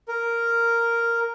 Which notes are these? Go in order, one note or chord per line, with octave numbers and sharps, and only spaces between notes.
A#4